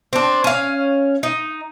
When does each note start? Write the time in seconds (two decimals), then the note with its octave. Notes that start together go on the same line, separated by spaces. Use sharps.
0.13 C4 D4
0.44 C#4 F5
1.23 D#4